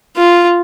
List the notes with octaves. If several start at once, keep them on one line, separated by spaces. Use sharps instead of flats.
F4